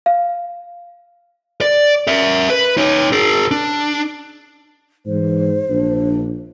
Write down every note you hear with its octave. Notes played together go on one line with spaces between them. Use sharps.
F5
D5
A#4 E5
B4
D#4 C#5
G#4 A#4
D4
G#2 E3 C5
A#1 D4